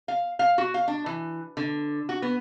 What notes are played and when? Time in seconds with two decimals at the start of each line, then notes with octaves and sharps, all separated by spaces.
0.08 F5
0.39 F5
0.58 F#4
0.74 F5
0.88 D4
1.06 E3
1.57 D3
2.09 F#4
2.22 B3